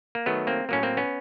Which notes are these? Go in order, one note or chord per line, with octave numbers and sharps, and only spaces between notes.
A#3
D#3 F#3 A3 B3
A#3 C4
A2 F#3 A#3 C#4
A#3 C4
B3 C#4